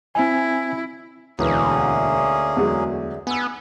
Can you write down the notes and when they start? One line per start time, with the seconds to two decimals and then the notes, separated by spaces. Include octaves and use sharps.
0.15 C4 E4 G#5
1.39 E1 D2 E3 A#3 C#4 G#4 B4
2.57 E2 F#3 G#3
3.27 B3 G#5 E6